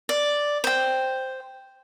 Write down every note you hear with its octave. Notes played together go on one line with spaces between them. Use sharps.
D5
C5 G5